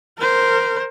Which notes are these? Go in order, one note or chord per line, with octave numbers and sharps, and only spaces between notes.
A#4 C5